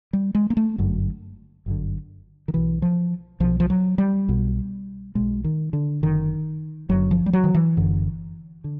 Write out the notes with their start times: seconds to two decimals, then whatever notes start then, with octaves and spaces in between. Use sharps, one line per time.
0.13 G3
0.35 G#3
0.50 A#3
0.57 A3
0.78 G1 F#2 D3
1.66 G1 F#2 D3
2.48 D#3
2.53 B1 B2 E3
2.82 F3
3.40 B1 B2 F3
3.60 F3
3.70 F#3
3.98 G3
4.28 B1 B2
5.15 B1 B2 G#3
5.44 D#3
5.73 D3
6.02 F#1 F#2 D3 D#3
6.89 F#1 F#2 D3 F#3
7.11 F3
7.26 G3
7.33 F#3
7.44 D#3
7.55 E3
7.77 F#1 F#2 D3
8.64 D3